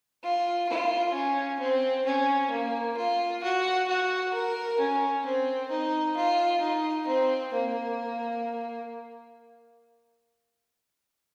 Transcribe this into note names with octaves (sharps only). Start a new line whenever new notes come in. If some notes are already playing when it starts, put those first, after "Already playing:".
F4
F4
C#4
C4
C#4
A#3
F4
F#4
F#4
A#4
C#4
C4
D#4
F4
D#4
C4
A#3